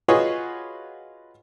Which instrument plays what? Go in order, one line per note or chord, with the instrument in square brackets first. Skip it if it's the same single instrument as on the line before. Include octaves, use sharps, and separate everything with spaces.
[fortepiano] F4 F#4 G#4 B4 C#5 D#5